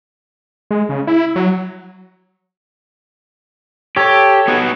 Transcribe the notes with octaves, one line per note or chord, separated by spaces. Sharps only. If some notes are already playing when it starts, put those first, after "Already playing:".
G#3
C#3
E4
F#3
G4 A4 C#5
B3 D#4 F#4